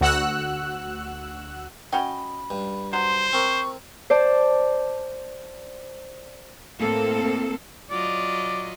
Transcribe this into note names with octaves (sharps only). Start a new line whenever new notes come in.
D2 F#4 F#5 E6 F#6
C#4 F#4 D#5 G5 B5
G2
F#3 C5 C6
C4 A#4 C#6
C5 D5 A5
A2 A#3 C4 A4
F#3 F4 D5 D#5